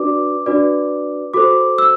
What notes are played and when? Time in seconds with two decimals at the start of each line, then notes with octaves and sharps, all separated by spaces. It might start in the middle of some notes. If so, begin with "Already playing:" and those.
Already playing: D4 F#4 B4 D5 D6
0.46 D4 F#4 B4 D5
1.34 F#4 A4 C5 D6
1.78 E6